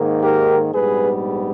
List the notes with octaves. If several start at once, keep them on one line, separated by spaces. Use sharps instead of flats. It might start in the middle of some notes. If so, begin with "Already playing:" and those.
Already playing: G#2 D#3 A#3
G4 A#4
A#1 G#2 G3 B3 G#4 B4